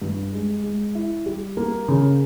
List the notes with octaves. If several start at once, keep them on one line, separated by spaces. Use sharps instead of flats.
G2
G#3
G#3
E4
G3
A#3
C#3